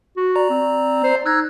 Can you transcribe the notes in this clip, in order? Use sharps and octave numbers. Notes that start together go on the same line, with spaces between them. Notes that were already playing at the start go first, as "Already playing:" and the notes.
F#4
D5 A#5
C4
C5
D#4 E6 F#6 G#6